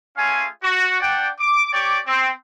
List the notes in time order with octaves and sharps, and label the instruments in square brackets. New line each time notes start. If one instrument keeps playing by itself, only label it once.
[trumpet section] A3 C#4 F4 G#4 F5 G#5
F#4
D4 D5 F#5 G5
D6
G4 C#5 D5 G5 D6
C4